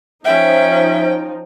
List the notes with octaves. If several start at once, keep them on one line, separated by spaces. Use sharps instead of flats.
F3 C#4 D#4 E5 G5